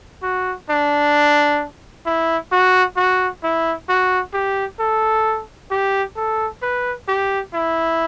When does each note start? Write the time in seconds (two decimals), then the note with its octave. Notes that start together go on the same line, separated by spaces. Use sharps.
0.22 F#4
0.69 D4
2.06 E4
2.52 F#4
2.96 F#4
3.43 E4
3.89 F#4
4.33 G4
4.79 A4
5.71 G4
6.16 A4
6.62 B4
7.08 G4
7.54 E4